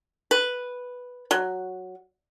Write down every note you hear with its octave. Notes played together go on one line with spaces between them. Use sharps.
B4
F#3